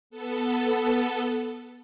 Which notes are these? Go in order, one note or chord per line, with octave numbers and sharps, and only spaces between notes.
B3 A4